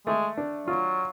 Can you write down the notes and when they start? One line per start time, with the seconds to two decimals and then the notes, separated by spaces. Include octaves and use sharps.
0.07 G#3 A3
0.37 D4
0.67 F#3 F4